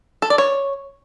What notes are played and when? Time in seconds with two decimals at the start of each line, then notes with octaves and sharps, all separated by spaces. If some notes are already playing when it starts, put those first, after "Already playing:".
0.22 A4
0.30 D5
0.38 C#5